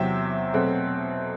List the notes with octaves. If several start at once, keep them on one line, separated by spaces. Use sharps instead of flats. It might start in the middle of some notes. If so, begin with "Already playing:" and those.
Already playing: E2 C3 F#3 C4 E5 G5
B2 F#3 A3 C4